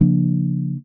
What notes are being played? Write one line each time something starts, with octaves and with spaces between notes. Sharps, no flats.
C#3 F3 A#3 D4